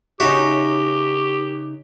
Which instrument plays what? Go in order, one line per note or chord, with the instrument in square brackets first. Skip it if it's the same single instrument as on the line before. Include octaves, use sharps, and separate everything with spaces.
[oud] C#3 D#4 E5 [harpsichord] F#4 [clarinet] G4